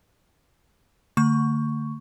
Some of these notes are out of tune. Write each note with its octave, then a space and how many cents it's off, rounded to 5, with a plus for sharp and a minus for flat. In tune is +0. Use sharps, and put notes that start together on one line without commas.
D3 +0 A3 +40 C#6 +5